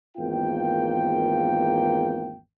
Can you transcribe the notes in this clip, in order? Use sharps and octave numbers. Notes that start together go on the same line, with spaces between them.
G#1 E2 A#3 F4 G5